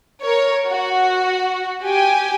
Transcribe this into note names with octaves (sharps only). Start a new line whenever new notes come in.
A#4 C#5
F#4
G4 G5 G#5